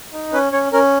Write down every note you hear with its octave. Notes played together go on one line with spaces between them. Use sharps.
D#4
C#4 B4
C#4 C#5
C#4 A#4